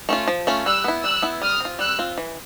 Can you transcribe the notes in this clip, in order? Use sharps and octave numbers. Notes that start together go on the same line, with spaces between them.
A3 C#4 F4
F3
A3 C#4 F4
G3 E6 F#6
B3 E4
G3 E6 F#6
B3 E4
G3 D#6 F6
C4 F4
G3 E6 F#6
C4 F4
E3